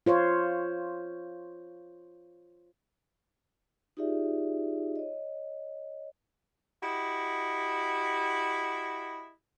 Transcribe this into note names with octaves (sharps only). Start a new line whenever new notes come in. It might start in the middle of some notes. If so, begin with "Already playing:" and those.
F4 C5 C#5
D#4 F4 G4 G#4 D5 E5
C#5 D#5
E4 F#4 G4 D#5